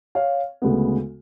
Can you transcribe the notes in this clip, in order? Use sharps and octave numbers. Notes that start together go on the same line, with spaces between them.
C#5 F5
D2 C#3 G#3 B3